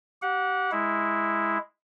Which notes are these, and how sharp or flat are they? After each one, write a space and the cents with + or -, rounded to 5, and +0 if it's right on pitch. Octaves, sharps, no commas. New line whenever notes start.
G4 -25 F#5 -20
G#3 +0 E4 -5